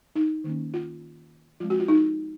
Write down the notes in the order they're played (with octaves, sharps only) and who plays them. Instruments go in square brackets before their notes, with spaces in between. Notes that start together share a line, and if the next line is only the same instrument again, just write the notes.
[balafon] D#4
D#3 A#3 C#4
F4
F3 G#3 C4 F4
F#4
F4
D#4